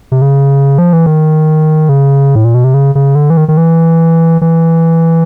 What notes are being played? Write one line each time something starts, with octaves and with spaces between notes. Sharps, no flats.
C3
C#3
F3
E3
D#3
C#3
A2
A#2
B2
C3
C#3
C#3
D3
E3
D#3
D#3
E3
E3